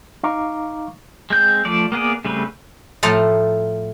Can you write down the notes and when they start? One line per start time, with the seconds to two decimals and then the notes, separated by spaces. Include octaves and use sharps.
0.23 D#4 F5 A#5 C#6 D6
1.30 G#3 C4 G6
1.65 F3 A3 D5
1.92 A#3 B3 G#4 D5
2.25 C#3 G3 A3 C4 B4
3.03 A2 F3 F4 A4 A5 A#5